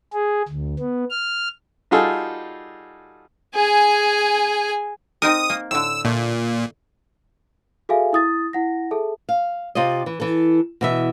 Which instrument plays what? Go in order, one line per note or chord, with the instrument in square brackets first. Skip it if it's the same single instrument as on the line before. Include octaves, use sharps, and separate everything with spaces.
[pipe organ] G#4
D2
B3
F6
[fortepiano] G3 D#4 F4 F#4 G#4 A4
[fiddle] G#4 G#5
[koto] C4 D#4 A#4 [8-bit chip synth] D#6
[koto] A#3
[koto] A2 D3 [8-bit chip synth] E6
[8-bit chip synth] A#2 [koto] A3
[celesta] F#4 G#4 A4 E5 F5 G#5
E4 D#6 A6
E4 F#5 A#6
G#4 A4 E5 A5
[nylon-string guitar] F5
C3 F4 D5 D#5
E3
E3 A4
B2 E3 E5